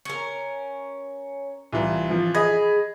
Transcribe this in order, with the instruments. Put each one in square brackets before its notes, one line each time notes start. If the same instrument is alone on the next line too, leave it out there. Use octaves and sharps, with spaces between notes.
[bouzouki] C#4 A#4
[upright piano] C2 [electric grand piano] E3 F4
[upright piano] F3
[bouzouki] G#4 [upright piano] D#5 [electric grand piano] B5 G#6